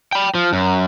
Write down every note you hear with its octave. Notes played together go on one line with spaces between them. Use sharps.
G5 B5
F3
F#2